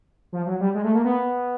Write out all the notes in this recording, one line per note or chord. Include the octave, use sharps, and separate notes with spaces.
F3
F#3
G3
G#3
A3
A#3
B3